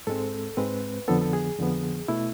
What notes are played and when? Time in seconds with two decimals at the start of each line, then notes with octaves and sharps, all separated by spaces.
0.07 G#2 G#3 C4 A4
0.57 G#2 G#3 C4 B4
1.08 F2 D3 F3 B3 A4
1.21 A4
1.33 G#4
1.59 F2 D3 F3 B3
2.08 B2 A3 E4